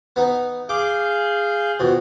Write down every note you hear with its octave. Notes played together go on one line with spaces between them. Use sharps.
B3 D#4
G#4 F5 D6 G6
F2 B2